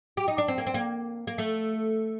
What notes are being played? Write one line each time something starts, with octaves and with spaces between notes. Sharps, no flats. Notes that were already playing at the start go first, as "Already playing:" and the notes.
G4
D#4
D4
C4
A#3
C4
A#3
A#3
A3